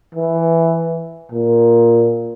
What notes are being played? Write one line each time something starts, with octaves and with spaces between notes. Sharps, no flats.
E3
A#2